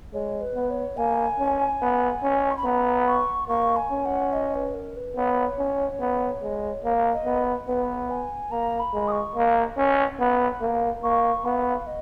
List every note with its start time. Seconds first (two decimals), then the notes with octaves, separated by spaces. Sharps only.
0.13 G#3 C#5
0.41 B4
0.55 B3
0.70 C#5
0.97 A#3 G#5
1.39 C#4
1.82 B3
2.23 C#4
2.50 C#6
2.57 B5
2.64 B3 A#5
3.07 C#6
3.48 A#3 C#6
3.76 G#5
3.91 C#4
4.05 F#5
4.33 D#5
4.54 B4
4.74 A#4
4.96 B4
5.16 B3 C#5
5.58 C#4
6.00 B3
6.42 G#3
6.84 A#3
7.12 D#5
7.25 B3
7.67 B3 B4
8.10 G#5
8.51 A#3 A#5
8.79 B5
8.93 G#3
9.07 D#6
9.12 C#6
9.35 A#3
9.77 C#4
10.19 B3
10.61 A#3
11.03 A#3 C#6
11.45 B3 F5
11.86 D#5